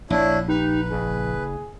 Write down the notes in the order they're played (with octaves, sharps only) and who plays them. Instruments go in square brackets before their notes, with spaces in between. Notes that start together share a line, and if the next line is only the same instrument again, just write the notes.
[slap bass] A#1 [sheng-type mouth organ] D4 E4 [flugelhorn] C#5
[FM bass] D#4 [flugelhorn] G4 [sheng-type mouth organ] B4
[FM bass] F#1 [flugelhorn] G#4